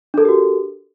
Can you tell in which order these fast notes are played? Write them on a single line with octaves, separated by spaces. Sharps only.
D4 A4 A#4 G4 F#4